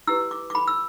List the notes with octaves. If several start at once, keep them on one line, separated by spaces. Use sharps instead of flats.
E4 G4 B4 E6
D6
D6
B5
E6